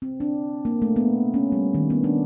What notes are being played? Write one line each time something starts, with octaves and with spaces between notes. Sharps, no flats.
C4
D4
A#3
A3
B3
C#4
G3
D#3
B3
D4